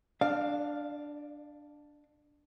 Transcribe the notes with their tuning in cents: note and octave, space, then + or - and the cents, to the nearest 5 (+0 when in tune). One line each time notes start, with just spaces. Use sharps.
D4 +0 D5 +40 F5 +0